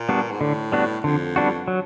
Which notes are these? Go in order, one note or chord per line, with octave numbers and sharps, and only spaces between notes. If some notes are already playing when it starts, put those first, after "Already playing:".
Already playing: A#2
G3 B3 D4 F#4
G#2
A2 D3
G3 B3 D4 F#4
F2 D3
G3 B3 D4 F#4
F#3